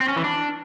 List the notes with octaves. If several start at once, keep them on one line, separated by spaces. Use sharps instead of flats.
C4
C#4
E3
D4